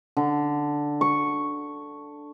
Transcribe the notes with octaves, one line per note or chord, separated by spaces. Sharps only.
D3
C#6